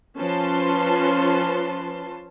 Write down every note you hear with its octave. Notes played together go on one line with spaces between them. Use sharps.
F3 C#4 B4 A5 C6